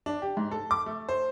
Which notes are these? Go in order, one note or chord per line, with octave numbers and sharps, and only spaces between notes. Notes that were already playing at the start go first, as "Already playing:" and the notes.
D4
G4
G#2
A4
D6
A3
C5